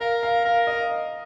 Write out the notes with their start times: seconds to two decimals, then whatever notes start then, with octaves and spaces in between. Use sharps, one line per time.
0.01 A#4 F5
0.23 F5
0.45 A#4 F5
0.67 D#5